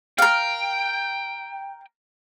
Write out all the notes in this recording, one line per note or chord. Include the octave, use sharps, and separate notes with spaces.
A#4 F5 G5